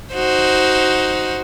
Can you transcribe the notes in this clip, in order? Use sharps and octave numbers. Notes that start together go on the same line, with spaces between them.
D#4 F#4 C5